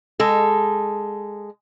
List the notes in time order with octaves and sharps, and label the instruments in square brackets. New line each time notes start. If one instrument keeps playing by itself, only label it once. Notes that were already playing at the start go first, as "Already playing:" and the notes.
[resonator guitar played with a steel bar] G#3 A4